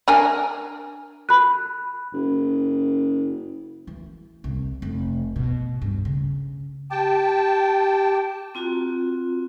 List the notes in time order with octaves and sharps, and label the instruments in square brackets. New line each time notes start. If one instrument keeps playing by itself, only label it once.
[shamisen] D4 A#4 G#5
[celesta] B5 F#6
[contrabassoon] F#1
[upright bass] E3
C2
F1
B2
G2
C#3
[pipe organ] G4 [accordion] G5 A5
[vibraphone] C4 F4 F#4 A#5